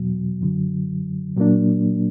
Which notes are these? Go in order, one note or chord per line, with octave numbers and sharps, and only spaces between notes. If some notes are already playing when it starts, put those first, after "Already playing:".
Already playing: E2 B2 F#3
F#2 D3 F#3
A#2 F#3 A#3 D4